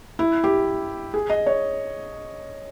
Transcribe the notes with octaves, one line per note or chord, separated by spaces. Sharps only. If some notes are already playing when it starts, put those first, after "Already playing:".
E4
G4
G#4
D#5
C#5